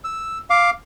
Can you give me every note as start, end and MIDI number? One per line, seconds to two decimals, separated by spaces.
0.04 0.38 88
0.50 0.70 77
0.50 0.70 86